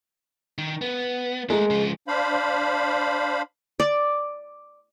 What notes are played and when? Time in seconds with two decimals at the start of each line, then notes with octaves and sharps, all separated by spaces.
0.58 D#3
0.81 B3
1.50 G#3 A3 A#4
1.70 C#3 F3
2.08 D4 C5 F5 B5
3.80 D5